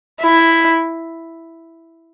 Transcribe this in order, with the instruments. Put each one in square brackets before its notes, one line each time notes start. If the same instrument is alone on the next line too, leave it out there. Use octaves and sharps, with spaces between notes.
[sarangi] E4